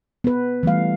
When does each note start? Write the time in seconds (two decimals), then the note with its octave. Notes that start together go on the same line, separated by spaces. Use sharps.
0.24 B3 B4
0.63 E3 G3 A3 F5